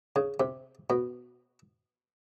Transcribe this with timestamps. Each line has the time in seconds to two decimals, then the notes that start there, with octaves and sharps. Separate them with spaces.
0.16 C#3
0.40 C3
0.90 B2